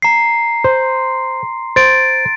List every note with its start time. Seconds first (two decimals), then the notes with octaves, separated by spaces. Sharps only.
0.02 A#5 C7
0.64 C5 C6
1.76 C5 A6 D7